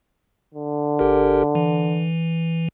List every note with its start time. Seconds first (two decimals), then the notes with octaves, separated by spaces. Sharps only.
0.54 D3
0.99 G1 G4 A#4
1.55 E3